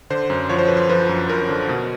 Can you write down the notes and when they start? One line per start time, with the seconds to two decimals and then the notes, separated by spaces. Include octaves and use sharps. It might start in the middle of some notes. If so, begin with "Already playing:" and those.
0.10 D3 C5
0.30 F#2
0.49 F3 C#5
0.59 C5
0.68 F3 B4
0.77 C5
0.89 F3 B4
1.09 F#2
1.29 F#2 A#4
1.49 D3
1.69 B2